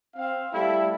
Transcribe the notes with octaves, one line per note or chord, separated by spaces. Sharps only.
C4 F5
G3 A3 E4